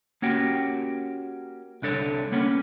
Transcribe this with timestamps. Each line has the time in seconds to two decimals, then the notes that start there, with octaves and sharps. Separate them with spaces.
0.22 A#3 C#4 F#4 G4
1.82 C2 D4 A4 C#5
2.32 A#3 B3 C#4